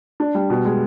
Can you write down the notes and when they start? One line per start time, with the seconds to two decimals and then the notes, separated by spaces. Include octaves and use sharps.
0.20 D4
0.35 G3
0.50 B2
0.65 G#3